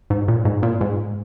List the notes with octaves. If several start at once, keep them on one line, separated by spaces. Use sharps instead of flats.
G#2
A#2
G#2
A#2
G#2